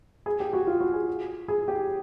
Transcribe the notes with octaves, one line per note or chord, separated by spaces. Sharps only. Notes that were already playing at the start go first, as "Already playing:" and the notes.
G#4
G4
F#4
F4
F#4
G#4
G#4
G4